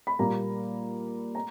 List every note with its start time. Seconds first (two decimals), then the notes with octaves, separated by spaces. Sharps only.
0.07 B5
0.19 A#2 G3 A#3 A#5
1.35 A#5